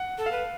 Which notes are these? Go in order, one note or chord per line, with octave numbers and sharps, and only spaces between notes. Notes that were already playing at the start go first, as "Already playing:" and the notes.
Already playing: F#5
A4
F5
B4